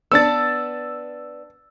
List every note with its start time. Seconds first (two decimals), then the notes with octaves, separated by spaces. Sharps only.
0.12 B3 D4 E6 A6